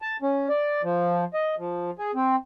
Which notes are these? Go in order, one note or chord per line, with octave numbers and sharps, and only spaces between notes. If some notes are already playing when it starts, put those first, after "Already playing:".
A5
C#4
D5
F3
D#5
F3
G#4
C4